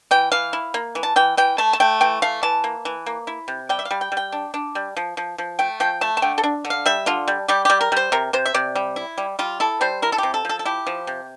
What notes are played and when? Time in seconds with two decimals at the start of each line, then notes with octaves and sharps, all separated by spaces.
0.11 E3 G5
0.32 E3 F5
0.53 E4
0.74 A#3
0.95 E3
1.03 A5
1.16 E3 G5
1.37 E3 G5
1.58 A3 A5
1.73 A5
1.80 A3 G5
2.01 E3 G5
2.22 A3 F5
2.43 E3 A5
2.64 A#3
2.85 E3
3.06 A#3
3.27 E4
3.48 C3
3.69 G3 G5
3.79 E5
3.85 F5
3.91 G3
4.01 G5
4.12 G3
4.17 G5
4.32 D4
4.54 D4
4.75 G3
4.97 F3
5.17 F3
5.38 F3
5.59 A3 G5
5.80 F3 G5
6.01 A3 A5
6.17 A5
6.22 D3 G5
6.38 A4
6.44 D4
6.65 D3
6.70 F5
6.86 G3 E5
7.06 D3 F4
7.28 G3
7.48 G3 G4
7.65 G3 G4
7.81 A#4
7.92 G3 C5
8.12 C3 A#4
8.33 C3 C5
8.46 E5
8.54 C3 D5
8.75 G3
8.96 E4
9.18 G3
9.39 G3 F4
9.60 E4 A4
9.81 G3 C5
10.02 E4 A#4
10.12 A4
10.18 C3 G4
10.34 A4
10.45 F3 A4
10.59 A4
10.65 E4 G4
10.87 F3
11.07 C3